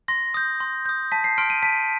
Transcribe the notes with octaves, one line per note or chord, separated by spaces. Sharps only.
C6 A#6
D#6 G6
C6
D#6 G6
A5 B6
C7
C6 F6 D7
D#7
A5 B6